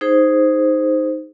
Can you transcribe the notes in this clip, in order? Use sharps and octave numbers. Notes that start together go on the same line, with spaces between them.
D#4 G#4 C5